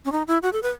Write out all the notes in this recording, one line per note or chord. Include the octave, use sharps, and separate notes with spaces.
C#4
D#4
E4
F#4
A4
B4